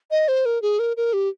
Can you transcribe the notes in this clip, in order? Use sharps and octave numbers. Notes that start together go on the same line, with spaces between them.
D#5
C5
A#4
G#4
A#4
A#4
G4